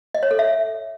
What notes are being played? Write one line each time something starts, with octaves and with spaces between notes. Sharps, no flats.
D#5
C#5
A4
E5